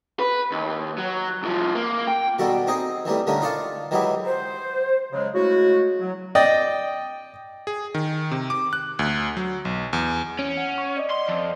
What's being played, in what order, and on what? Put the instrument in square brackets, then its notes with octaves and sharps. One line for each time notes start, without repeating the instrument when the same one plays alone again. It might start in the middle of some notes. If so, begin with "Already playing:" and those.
[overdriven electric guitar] B4
D#2
F#3
C2 F3
A#3
G5
[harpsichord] B2 D#3 G3 F#4 A4
C4 D#4 G#4 D#5
D#3 E3 G3 A3
D3 D#3 G3 A3 C#4 A#4
D#4 F4 D5 F5 A5 C#6
D#3 E3 F#3 G#3 E4 G4
[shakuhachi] C5
[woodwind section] C#3 F#3 G#3
C#3 G#3 A3 E4 F#4
F#3
[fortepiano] D5 D#5 G5
[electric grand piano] G#4
D#3
C3
D6
F#6
D2
F#3
B1
E2
[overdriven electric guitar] C#4 [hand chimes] D7
[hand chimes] F#5
C#6
D5 D#5
[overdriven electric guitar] C6
F2